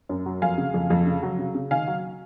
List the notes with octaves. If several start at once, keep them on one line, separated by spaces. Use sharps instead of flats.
F#2
F#3
F2 F5 G#5
C#3
F2
F2
C#3
F#3
C#3
C#3
D#3 F5 G#5
F#3